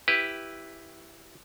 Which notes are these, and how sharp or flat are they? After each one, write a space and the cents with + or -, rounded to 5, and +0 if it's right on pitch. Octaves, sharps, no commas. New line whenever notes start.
E4 +0 G4 +0 B4 +0